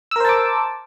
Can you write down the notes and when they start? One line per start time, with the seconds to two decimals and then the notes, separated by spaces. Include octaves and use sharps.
0.11 E6
0.16 A#4
0.20 C5
0.25 A5
0.29 D6